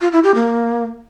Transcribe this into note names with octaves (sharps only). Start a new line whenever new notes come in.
F4
E4
G4
A#3